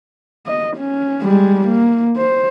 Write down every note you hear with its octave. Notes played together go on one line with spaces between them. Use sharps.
D#5
C#4
G3 G#3
A#3
C5